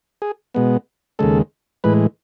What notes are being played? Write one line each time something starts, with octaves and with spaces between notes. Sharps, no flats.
G#4
B2 G#3 B3
D#2 C#3 G#3 A4
A2 E3 G#3 B4